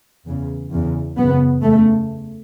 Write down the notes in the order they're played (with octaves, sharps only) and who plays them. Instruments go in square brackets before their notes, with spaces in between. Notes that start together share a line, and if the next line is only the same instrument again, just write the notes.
[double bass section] E2 C#3
E2 C#3
F#2 C#3 B3
E2 C#3 A3